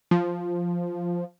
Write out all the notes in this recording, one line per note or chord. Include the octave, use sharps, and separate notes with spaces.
F3